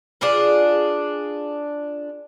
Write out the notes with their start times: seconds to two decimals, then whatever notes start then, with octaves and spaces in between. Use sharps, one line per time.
0.21 D4 F4 G#4 B4